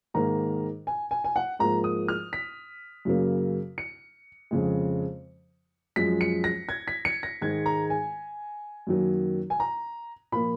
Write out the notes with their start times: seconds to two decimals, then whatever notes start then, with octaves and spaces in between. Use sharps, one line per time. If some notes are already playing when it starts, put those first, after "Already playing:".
0.14 G#2 D#3 A#3 A#5
0.87 G#5
1.11 G#5
1.24 G#5
1.36 F#5
1.59 G#2 F3 A#3 A#5
1.84 D#6
2.08 F6
2.33 B6
3.05 F#2 C#3 F#3 A#3
3.78 C#7
4.51 F2 C#3 G#3
5.96 F#2 F3 G#3 B6
6.21 C#7
6.44 A#6
6.69 G#6
6.88 B6
7.05 C#7
7.23 A#6
7.41 G#2 D#3 G#3 G#6
7.66 A#5
7.90 G#5
8.87 F#2 D#3 F#3 A#3
9.50 G#5
9.60 A#5
10.32 A#2 F3 A#3 B5